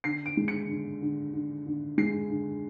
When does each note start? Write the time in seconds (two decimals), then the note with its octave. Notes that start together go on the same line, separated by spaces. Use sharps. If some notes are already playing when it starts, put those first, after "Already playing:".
0.04 D3 C7
0.26 D7
0.37 G#3
0.48 C#7
0.69 D3
1.02 D3
1.33 D3
1.66 D3
1.98 G#3 C7
2.30 D3